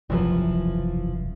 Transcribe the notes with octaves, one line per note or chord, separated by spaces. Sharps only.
E1 C2 F#2 E3 F3 B4